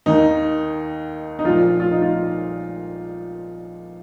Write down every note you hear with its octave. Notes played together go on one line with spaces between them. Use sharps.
D#2 D#3 D#4
D#4
A#1 A#2 F3 F4
F4
D#4
F4